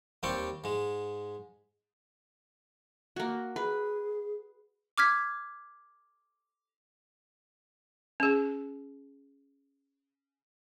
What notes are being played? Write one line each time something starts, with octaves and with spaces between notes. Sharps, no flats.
D#2 G3 C4 G5 A5 C#6
G#2 G#3
A#3 F#4
G#4 B4
D6 F6 G#6 B6
C#4 G#4